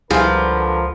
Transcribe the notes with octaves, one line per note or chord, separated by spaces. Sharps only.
C#2 D3 F3 G3 E4 G#4 A#4 B4